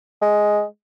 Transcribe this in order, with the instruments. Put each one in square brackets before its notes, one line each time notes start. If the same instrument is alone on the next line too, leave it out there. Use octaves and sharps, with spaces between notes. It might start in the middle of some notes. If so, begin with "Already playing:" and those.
[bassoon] G#3